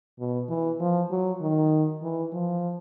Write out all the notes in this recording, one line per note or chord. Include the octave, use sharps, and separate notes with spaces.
B2
E3
F3
F#3
D#3
E3
F3